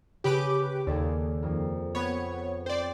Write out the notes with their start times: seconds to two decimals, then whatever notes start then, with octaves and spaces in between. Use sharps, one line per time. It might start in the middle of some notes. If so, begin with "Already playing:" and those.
0.24 C#3 G4 B4 D6
0.87 D#2 G#4 A4 D5
1.43 F2 A#3
1.95 B3 C#5 B5
2.66 C4 C5 D5